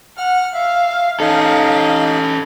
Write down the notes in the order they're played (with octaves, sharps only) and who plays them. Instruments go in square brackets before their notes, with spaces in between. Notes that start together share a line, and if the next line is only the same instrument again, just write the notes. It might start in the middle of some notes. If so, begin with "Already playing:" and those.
[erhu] F#5 [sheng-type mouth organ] F6
[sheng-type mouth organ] E5 [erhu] F5
[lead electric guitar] C#4 A4 [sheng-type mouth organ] D#4 [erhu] F5